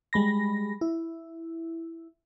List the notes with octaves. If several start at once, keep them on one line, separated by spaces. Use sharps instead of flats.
G3 G#3 B5 A#6
E4